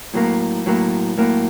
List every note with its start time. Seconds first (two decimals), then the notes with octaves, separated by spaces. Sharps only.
0.14 A2 F#3 A#3
0.66 A2 F#3 A#3
1.18 A2 F#3 A#3